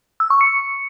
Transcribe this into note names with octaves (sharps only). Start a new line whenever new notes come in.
E6
C#6
C#7